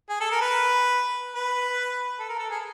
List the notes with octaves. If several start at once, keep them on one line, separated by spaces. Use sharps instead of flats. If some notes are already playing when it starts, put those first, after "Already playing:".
G#4
A4
A#4
B4
B4
A4
A#4
A4
G#4